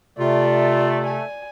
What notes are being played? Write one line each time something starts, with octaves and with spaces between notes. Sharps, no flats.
C3 A3 F4 D5
G#5